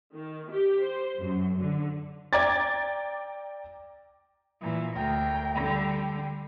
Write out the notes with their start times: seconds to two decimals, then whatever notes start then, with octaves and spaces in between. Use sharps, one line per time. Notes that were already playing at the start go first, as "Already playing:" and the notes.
0.14 D#3
0.51 G4
0.84 C5
1.20 F#2
1.60 D3
2.33 D5 G5 A#5 D6 G#6 A6
4.61 A#2 E3
4.95 D2 A#4 G5
5.55 D3 G3 G5